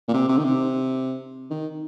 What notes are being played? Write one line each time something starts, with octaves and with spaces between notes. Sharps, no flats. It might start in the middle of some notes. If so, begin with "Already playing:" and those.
A#2
C3
C3
D#3
C3
D#3